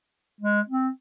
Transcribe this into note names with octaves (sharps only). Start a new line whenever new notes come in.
G#3
C4